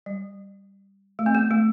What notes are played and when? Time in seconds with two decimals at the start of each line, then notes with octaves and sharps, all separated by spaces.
0.06 G3
1.19 A3
1.26 C4
1.35 B3
1.51 A3